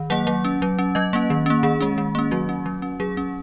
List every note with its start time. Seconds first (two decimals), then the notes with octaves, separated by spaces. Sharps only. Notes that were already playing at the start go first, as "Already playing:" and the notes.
Already playing: D#3
0.10 F#3 A#3 F#5
0.27 F#3
0.45 C#4
0.62 F#3
0.79 C#4
0.95 F#3 D#5
1.13 A#3 C#4
1.30 D#3
1.46 A#3 C#4
1.63 D#3 G#4
1.81 G#3 C#4
1.98 D#3
2.15 A#3 C#4
2.31 F#3 F#4
2.49 C#4
2.66 F#3
2.82 C#4
3.00 F#3 G#4
3.17 C#4